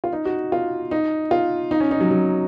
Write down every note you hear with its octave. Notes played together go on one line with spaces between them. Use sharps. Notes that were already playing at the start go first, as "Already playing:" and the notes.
F4
D#4
F#4
F4
D#4
F4
D#4
C#4
D#4
F#3
F#3